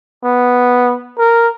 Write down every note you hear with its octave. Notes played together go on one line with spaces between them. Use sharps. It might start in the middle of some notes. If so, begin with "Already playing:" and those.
B3
A#4